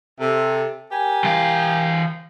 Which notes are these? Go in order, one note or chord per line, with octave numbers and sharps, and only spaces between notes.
C3 A4
G4 A#4 G#5
E3 F5